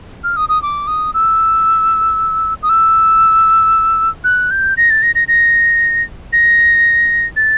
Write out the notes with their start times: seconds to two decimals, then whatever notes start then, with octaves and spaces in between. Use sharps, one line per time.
0.24 F6
0.37 D#6
0.49 D#6
0.62 D6
0.87 D#6
1.14 E6
2.63 D#6
2.69 E6
4.24 F#6
4.51 G6
4.77 A#6
4.90 A6
5.03 A#6
5.15 A#6
5.28 A#6
6.33 A#6
7.36 A6